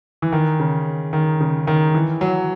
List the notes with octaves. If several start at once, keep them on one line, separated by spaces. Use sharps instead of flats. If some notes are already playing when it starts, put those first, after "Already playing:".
E3
D#3
C#3
D#3
C#3
D#3
E3
F#3